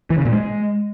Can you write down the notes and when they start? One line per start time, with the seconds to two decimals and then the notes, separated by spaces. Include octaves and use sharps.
0.10 E3
0.18 C#3
0.25 A#2
0.33 G#3